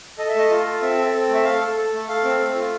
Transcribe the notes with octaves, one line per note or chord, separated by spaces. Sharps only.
A4 D#5
E5
A3 D#5
F4
A4
C4 E5
A4
C4
A3
E5
A4 F5
A4
A4
A3
A4 F5
C4
A3
F4